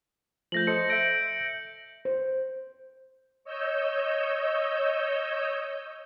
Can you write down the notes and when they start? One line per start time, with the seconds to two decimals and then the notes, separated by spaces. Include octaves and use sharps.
0.52 F3 A3 G6 A#6 F#7
0.67 A4 C5 D#5 C#7
0.90 E5 G6 A#6 D7
2.05 C5
3.44 C#5 D#5 E6 G6